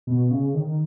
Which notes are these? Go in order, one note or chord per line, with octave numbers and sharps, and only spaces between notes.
B2
C#3
D#3